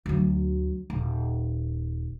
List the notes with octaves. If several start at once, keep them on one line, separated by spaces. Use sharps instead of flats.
D2 F#3
D#1